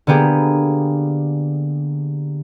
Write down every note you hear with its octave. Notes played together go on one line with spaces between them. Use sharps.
D3 A#3 B3 G4 G#4